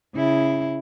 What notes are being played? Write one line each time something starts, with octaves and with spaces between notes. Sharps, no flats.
C#3 E4